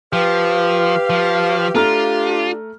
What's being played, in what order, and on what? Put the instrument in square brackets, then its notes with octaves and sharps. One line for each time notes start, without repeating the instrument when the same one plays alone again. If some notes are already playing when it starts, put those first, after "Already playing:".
[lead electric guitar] F3 [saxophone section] G4 F5 [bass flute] B4
[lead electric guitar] F3
[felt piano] A3 A#5 F6 [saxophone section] D4 G4 [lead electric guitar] F4